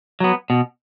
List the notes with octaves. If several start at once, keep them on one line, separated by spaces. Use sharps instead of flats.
F#3 B3
B2